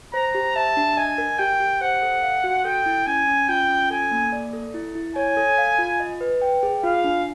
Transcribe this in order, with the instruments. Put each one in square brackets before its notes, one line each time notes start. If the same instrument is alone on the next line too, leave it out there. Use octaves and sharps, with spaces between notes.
[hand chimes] C5 [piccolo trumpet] A#5
[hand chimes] G4
[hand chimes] E5 [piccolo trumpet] A5
[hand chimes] D4
[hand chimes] D#5 [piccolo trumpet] G#5
[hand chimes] A#4
[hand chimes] G4 [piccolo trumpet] G5
[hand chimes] G4
[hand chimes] C5 [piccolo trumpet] F#5
[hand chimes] A4
F5
F#4
[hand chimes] A4 [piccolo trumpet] G5
[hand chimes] E4
[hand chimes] C#4 [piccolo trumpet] G#5
[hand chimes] C#4
[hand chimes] F4 [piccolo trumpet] G5
[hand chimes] C#4
[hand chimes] A4 [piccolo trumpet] G#5
[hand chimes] A#3
D5
A4
E4
E4
[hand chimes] C#5 [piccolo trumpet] G#5
[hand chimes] A4
F5
F4
D#5
B4
G5
G#4
[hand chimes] F4 [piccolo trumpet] F5
[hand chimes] D4